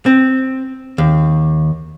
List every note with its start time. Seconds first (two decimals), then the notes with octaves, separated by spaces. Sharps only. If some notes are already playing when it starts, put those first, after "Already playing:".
0.06 C4
0.98 D#2